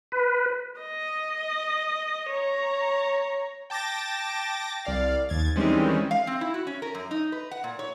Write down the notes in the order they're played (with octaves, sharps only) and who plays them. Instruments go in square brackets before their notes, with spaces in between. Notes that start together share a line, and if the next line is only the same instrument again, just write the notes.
[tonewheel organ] B4
[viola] D#5
C#5 A#5
[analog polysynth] G5 A5 D6 A6 A#6
C2 D5 F5
D#2 G#6 A6
D#3 E3 G3 G#3 C4 C#4
[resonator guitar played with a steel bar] F5
C4
E4
F#4
C#4
A#4
F#2
D#4
B4
F#5
A#2
C#5